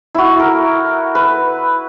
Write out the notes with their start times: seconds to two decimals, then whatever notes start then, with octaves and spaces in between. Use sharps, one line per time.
0.15 E4 F#4
0.39 A#4
1.15 B4